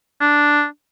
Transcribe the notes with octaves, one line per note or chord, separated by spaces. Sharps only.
D4